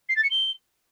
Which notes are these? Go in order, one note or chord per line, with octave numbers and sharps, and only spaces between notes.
C7
A6
C#7
G7